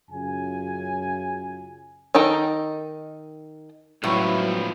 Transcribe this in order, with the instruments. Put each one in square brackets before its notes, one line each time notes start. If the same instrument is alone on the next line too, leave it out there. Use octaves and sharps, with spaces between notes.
[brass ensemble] F#2 C#3 F4 G#5
[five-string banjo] D#3 D#4 A4 G5 A#5
[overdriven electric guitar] C#2 F3 [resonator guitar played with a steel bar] A2 B4 [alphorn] F#3 [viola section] E4